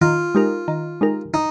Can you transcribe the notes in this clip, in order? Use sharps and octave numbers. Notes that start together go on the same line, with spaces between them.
D#3 F4
G#3 D#4 G4 A#4
D#3
G#3 D#4 G4 A#4
D#4